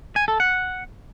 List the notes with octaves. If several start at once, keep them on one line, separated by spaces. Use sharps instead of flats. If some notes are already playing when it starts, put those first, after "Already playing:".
G#5
A4
F#5